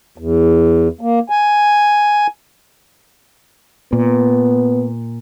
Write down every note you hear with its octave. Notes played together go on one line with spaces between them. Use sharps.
E2
A#3
G#5
A#2 B3